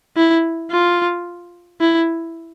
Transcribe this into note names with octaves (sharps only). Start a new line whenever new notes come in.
E4
F4
E4